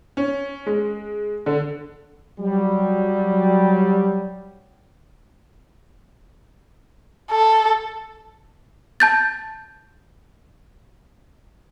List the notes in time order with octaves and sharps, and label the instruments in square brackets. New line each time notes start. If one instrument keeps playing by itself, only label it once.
[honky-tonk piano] C#4
G#3
D3
[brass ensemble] F#3 G3
[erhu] A4
[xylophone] A5 G6 A6